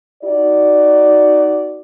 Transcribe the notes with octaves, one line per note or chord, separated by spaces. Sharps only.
D#4 F#4 D5